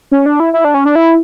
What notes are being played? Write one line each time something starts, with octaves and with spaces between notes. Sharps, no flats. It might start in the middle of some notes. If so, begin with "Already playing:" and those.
C#4
D4
E4
E4
D4
C#4
D4
E4